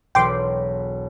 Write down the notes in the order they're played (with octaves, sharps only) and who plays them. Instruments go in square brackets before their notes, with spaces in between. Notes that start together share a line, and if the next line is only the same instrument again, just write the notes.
[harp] E1 B1 B4 [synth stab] G5 C6 D6